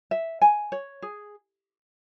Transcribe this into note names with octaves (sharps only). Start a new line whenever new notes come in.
E5
G#5
C#5
G#4